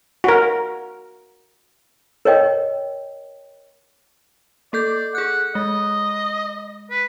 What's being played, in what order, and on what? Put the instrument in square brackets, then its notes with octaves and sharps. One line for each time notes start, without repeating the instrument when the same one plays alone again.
[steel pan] F#4 A#4
[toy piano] A#4 C#5 D#5 G5
[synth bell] A#3 A4 G6 [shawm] D5
[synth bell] G#4 F#6 [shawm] F#5
[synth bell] G#3 [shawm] D#5
[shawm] B4